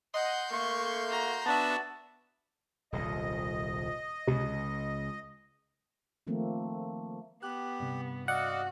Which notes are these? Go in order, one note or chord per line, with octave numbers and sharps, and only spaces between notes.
D#5 F#5 C6 G6
A3 A#3 C#6
F#4 A#5
B3 D4 F#4 E5 A5
D#1 C2 D#5
C#2 C3
D#3 F3 A3 A#3 C4
B3 G4 F#6
G2 C3
F#4 D5 D#5 F5 F#5